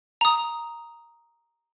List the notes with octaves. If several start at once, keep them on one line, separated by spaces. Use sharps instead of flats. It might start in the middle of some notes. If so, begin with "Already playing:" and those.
A#5 D#6